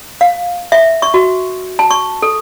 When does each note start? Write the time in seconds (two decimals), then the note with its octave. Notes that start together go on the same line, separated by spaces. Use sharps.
0.21 F5
0.72 E5
1.02 C#6
1.14 F#4
1.79 A5
1.91 C#6
2.22 A4